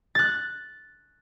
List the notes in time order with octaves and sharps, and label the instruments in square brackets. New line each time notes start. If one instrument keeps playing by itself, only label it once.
[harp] F#6 A6